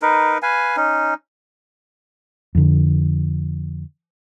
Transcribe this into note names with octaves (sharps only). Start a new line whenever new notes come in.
D#4 A#4 B4
B4 F5 G#5
C#4 D#4
F2 D3